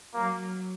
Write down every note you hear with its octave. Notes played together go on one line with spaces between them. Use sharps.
F#3 A#3